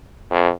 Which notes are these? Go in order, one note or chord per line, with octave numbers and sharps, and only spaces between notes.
F2